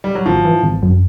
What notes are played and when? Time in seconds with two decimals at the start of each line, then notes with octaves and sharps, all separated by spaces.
0.04 G3
0.15 F#3
0.26 G#1 F3
0.45 E3
0.63 G#1
0.82 F#2